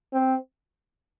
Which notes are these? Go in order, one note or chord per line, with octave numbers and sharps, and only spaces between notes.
C4